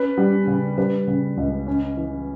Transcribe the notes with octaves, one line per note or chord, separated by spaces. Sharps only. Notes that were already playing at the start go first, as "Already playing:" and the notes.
Already playing: C#4 B4
G3
C#3
G3 B4
C#3
C#2
C#4
E3